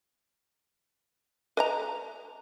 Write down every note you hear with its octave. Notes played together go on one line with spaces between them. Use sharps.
B4 D#5 A#5